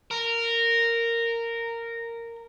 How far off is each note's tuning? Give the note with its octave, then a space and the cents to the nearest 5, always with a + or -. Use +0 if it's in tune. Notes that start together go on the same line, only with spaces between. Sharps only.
A#4 -10